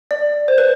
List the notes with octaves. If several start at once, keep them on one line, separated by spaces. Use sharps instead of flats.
D5
C5
B4